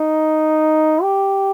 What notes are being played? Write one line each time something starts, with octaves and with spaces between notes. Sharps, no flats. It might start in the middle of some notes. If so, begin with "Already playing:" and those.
Already playing: D#4
G4